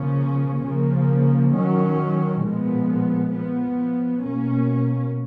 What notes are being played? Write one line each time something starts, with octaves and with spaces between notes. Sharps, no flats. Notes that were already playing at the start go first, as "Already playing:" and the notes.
Already playing: C#3 F3 A#3 C#4
C#3 F3 A#3
D#3 F#3 C#4
A#2 F3 G#3 B3
F3 B3
B2 A#3 C#4